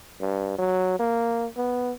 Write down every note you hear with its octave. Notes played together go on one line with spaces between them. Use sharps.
G2
F#3
A#3
B3